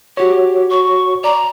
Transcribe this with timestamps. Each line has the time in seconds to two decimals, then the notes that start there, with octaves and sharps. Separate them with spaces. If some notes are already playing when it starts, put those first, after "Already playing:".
0.17 F#4 G4 C#5
0.70 C#6
1.24 D5 A#5